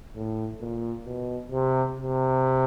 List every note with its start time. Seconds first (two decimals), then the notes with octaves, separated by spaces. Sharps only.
0.15 A2
0.61 A#2
1.06 B2
1.52 C3
1.96 C3